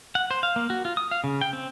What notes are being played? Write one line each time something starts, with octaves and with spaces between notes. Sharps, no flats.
F#5
C5
F5
A#3
F#4
F4
D#6
F5
C#3
G5
C4